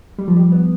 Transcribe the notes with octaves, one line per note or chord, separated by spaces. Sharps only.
G3
F3
G3
B3